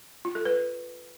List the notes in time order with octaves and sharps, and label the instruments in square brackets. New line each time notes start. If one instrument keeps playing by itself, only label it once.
[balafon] F4
A4
B4